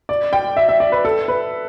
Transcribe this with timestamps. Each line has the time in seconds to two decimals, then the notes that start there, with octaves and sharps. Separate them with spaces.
0.09 D5
0.33 G5
0.57 E5
0.69 E5
0.80 D5
0.92 B4
1.05 A4
1.28 B4